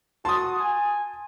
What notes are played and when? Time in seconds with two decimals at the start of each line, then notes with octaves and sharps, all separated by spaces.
0.25 F#4 A5 C6 D#6
0.60 G#5